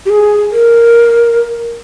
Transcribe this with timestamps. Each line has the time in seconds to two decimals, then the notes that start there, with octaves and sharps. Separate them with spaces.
0.06 G4
0.10 G#4
0.51 A#4